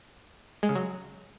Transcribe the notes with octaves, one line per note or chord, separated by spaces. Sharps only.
G#3
C#3
F#3